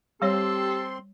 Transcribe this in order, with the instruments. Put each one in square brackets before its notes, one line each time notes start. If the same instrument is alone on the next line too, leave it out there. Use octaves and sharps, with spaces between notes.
[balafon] G3 C#5 [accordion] C4 C6 [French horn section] G4 [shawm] A4